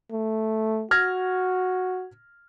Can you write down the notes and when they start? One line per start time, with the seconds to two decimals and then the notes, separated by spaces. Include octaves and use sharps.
0.12 A3
0.91 F#4 F6 G#6 A#6